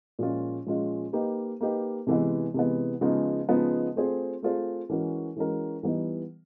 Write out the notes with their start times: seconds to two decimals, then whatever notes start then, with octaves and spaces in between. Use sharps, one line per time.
0.19 A#2 F3 G#3 C#4 F4
0.66 A#2 F3 G#3 C#4 F4
1.13 A#3 D#4 G4 B4
1.61 A#3 D#4 G4 B4
2.07 C3 E3 G#3 B3
2.54 C3 E3 G#3 B3
3.01 C#3 F3 G#3 B3 D#4
3.48 C#3 F3 G#3 B3 D#4
3.96 A3 C4 F4 G#4 C5
4.42 A3 C4 F4 G#4 C5
4.90 E3 G#3 C#4 F#4 A#4
5.37 E3 G#3 C#4 F#4 A#4
5.83 E3 G3 B3 D#4